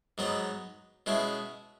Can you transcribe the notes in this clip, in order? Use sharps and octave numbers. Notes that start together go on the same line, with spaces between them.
G#2 F#3 B3 D#4
B2 G#3 C#4 E4